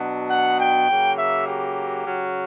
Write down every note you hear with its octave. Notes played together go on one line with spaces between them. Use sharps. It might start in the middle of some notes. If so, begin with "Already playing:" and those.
Already playing: B2 F#3 B3 D4
F#5
G5
C#3 F#3 A#3
E5
G4
C#3 F#3 C#4